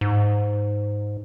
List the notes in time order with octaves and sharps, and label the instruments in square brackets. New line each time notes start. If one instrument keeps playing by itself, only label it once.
[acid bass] G#2